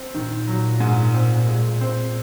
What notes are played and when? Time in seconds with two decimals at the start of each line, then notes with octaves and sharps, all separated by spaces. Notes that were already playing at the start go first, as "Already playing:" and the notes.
Already playing: C4
0.14 A#2 D#3
0.47 F#3
0.80 G#2
1.14 C4
1.47 G#3
1.81 C4